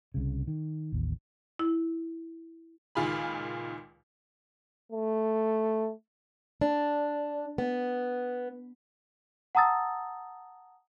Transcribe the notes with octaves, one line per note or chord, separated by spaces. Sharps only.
C2 C#3
D#3
A1 D#2
E4
C#2 A#2 D#3 F4 G#4 B5
A3
D4
B3
F#5 A5 A#5 D#6 E6 A6